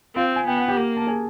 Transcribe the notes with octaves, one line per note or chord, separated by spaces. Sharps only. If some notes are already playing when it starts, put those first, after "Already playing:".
C4 F4 F5
G#5
B3 G5
F#5
G4 G5
A#3
A5
G#4 G#5